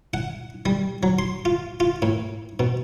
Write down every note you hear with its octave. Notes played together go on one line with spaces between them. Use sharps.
F#5
G3
F#3
C6
F4
F4
A2
B2